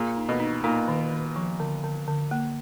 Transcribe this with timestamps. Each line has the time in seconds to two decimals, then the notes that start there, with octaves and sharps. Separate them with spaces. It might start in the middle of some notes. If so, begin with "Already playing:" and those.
Already playing: A#2 G#4
0.16 D#4
0.29 B2
0.40 D#4
0.64 A#2 D#4
0.88 D#3
1.12 D#3
1.36 F3
1.60 D3
1.84 D3
2.08 D3
2.31 A#3